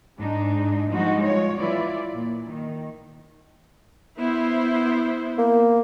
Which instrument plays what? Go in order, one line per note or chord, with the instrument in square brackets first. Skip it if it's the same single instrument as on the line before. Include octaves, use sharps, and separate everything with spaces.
[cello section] G#2 G#3 D4 D#4
F3 G3 G#3 D#4 F#4
F4 C#5
E3 E4 F4 D5
A#2
D#3
[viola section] B3 E4 C5
[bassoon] A#3